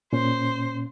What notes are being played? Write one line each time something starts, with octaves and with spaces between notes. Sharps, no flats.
A#2 C#4 C5